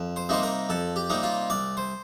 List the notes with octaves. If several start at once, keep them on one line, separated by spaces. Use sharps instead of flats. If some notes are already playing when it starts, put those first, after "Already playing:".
Already playing: F2
C5
C3 G3 A#3 D#4 C5
A#4
F2 A4
G4
C3 G3 A#3 D#4
F4
C2 D5
C5